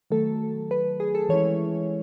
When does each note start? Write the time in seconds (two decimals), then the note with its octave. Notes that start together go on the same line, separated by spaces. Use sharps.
0.10 D#3 F#3 A3 A4
0.71 B4
1.00 G#4
1.15 A4
1.29 E3 G#3 C#4 E4 C#5